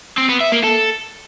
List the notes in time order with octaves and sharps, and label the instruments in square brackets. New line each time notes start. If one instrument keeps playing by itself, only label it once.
[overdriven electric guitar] C4
B3
E5
A#3
A4